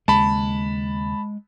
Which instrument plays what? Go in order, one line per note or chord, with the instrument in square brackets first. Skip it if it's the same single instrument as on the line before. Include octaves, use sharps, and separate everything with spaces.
[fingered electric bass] D#2 C#3 [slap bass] G#3 [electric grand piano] A5 B5